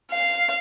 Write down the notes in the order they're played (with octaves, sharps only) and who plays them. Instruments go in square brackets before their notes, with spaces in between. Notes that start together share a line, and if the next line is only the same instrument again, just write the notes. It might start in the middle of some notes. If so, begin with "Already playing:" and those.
[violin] F5